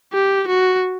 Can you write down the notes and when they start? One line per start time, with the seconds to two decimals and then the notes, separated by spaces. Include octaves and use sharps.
0.13 G4
0.47 F#4